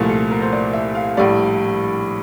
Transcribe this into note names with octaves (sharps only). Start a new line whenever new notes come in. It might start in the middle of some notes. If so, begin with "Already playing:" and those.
Already playing: C2 A#2 F3 A3
A4
A#4
C5
D5
E5
F5
A#1 A2 G3 D5